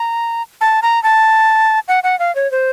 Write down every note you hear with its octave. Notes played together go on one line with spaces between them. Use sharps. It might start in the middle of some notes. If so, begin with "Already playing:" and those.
Already playing: A#5
A5
A#5
A5
F#5
F#5
F5
C#5
C5